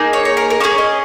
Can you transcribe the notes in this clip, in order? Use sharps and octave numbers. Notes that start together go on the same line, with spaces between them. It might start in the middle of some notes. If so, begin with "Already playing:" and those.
Already playing: A#3 D#4 G#4
C#5
C#5
A#4
A#4
A#3 C#4 G#4 C#5
D#5